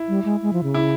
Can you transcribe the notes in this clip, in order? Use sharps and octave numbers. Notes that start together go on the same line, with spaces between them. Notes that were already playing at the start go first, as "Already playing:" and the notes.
Already playing: E4
G3
G#3
G#3
F3
C#3
E4